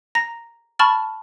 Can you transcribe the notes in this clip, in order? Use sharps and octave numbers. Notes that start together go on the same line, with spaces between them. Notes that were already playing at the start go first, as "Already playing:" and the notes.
A#5 A#6
A5 B5 C#6 F6 A6